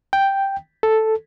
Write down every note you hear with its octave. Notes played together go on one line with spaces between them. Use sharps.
G5
A4